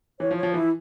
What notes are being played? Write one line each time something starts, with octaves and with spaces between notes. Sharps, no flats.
E3 C#5
F3
C#5
F3
E3 E4